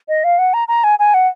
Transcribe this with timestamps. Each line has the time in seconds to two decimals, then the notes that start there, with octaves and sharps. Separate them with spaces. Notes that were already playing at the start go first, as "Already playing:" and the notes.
0.08 D#5
0.24 F5
0.38 F#5
0.53 A#5
0.68 A#5
0.84 G#5
0.99 G#5
1.14 F#5